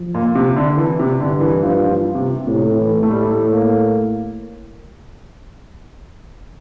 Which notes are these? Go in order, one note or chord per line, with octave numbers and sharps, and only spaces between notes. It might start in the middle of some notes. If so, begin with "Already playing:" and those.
Already playing: F3
A#2
C3
D3
E3
C3
G2 D3
E3
F3
F3
C3
A2 C3
E3
A3
A2 G3
G3
A3
A#3